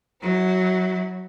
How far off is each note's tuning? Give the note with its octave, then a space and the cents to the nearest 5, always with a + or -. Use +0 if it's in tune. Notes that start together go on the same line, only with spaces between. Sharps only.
F#3 +0 E4 -35